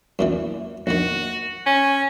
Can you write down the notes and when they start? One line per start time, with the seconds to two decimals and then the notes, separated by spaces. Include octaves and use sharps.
0.19 F#2 A#2 E3
0.87 A#1 D#3 F#4
1.66 C#4 G#5